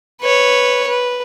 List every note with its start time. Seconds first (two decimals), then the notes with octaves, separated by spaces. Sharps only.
0.21 B4 C#5
0.87 B4